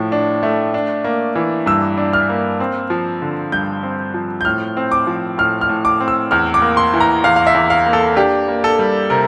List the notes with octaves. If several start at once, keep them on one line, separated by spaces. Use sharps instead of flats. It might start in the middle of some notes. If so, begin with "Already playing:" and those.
Already playing: A2 F3
D4
A3
D4
A#3
E3
G2 E6
D4
F6
A#3
C4
F3
D3
G2 G6
C4
F3
G6
A2 F6
C4
D6
F3
A2 F6
F6
A2
D6
C4
E6
E2 F6
D6
A#3
C6
E3
A#5
E2 F5
F5
E5
E2
F5
A#3
A4
D4 G4
A#3
A4
G3
C3 A#4